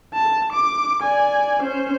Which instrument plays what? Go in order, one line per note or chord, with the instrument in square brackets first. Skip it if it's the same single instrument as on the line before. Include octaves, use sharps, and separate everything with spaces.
[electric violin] A5
D6
D5 G#5
C#4 C5